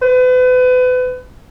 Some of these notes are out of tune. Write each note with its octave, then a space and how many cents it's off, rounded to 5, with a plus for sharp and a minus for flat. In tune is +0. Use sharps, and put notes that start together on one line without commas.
B4 +35